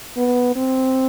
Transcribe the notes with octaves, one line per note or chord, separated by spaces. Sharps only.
B3
C4